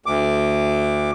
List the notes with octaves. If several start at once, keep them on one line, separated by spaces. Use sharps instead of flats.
D2 D6